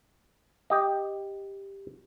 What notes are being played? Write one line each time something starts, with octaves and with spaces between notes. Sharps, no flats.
G4 D#5